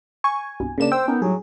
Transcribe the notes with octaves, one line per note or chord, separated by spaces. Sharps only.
G#5 C#6
C2 G2 B2
A1 C#3 A#3 D4 E7
C5 G5 E6
B3 C#4 D#4 A#4
A2 F#3 G3 G#4